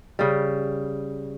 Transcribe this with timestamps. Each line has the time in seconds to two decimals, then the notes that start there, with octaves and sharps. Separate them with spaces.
0.19 C#3 G3